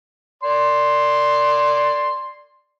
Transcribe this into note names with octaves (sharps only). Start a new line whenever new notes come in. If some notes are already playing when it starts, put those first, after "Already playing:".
D5 C6